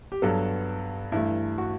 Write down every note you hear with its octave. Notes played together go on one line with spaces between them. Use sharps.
G4
G2 F#3 B3 A4
G2 E3 A3 E4
F#4